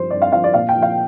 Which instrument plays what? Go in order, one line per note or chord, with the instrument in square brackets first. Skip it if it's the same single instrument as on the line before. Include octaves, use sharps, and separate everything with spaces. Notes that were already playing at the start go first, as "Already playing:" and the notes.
Already playing: [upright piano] G2 F3 C5
G2 D5
F5
F3 F5
D5
A#2 F5
G5
F3
F5